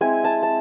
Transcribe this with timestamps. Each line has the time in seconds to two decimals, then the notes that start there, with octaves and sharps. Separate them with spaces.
0.01 G#3 C4 E4 G#5
0.24 A5
0.43 A5